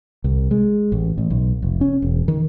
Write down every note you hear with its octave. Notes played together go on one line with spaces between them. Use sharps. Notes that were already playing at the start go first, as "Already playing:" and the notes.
C2
G#3
A1
A1
B1
F1
C#4
E1
D#3